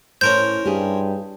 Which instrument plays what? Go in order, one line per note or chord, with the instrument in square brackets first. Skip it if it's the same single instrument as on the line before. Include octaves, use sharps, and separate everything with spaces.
[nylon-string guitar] A2 [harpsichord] C#4 A#4 C5 [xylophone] G6
[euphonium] G2 [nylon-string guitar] G4 G#4